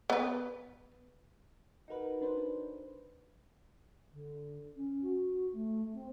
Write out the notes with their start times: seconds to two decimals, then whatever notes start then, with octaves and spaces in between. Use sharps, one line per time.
0.10 B3 B4
1.88 D#4 F#4 A#4 B4
2.22 D4 B4 C5
4.12 D3
4.76 C#4
5.02 F#4
5.53 A3
5.94 C4